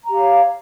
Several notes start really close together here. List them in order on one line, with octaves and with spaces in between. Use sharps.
A#5 G4 F5 C#5